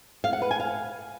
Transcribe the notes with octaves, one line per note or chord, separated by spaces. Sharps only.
F5
F#5
B4
G#5
F5